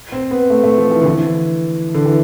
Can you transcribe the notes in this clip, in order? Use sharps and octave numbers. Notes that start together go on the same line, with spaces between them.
C4
B3
A3
A3
F3
E3
D3
E3
D3
E3